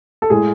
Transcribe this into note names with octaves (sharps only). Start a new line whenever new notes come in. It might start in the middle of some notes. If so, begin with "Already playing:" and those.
A4
A2 G#3 G#4